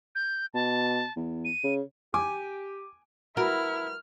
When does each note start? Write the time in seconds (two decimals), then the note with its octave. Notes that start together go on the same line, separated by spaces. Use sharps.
0.15 G6
0.54 B2 A5
1.16 E2
1.45 D#7
1.64 C#3
2.14 G4 G#5 D6
3.37 E4 F#4 A#4 B4 F6